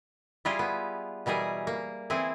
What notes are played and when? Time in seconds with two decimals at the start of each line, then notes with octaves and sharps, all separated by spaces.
0.45 G3 E4 F4 G4 G#4
0.59 B3
1.26 B2 E3 G3 G#4 A#4
1.67 A#3
2.10 E3 C4 E4 G#4